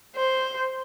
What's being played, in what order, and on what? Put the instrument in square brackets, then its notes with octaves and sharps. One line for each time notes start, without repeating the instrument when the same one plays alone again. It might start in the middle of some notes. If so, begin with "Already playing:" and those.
[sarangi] C5